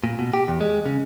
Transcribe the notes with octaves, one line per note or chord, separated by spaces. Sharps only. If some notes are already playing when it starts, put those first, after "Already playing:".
A#2
B2
G4
E2
G#3
C#3